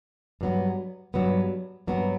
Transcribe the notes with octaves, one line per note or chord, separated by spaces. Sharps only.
G2 F#3 B3
G2 F#3 B3
G2 F#3 B3